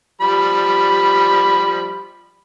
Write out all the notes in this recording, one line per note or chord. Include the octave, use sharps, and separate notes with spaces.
F3 G3 B5